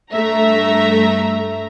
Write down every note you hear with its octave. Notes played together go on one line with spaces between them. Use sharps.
G2 A3 E5 A#5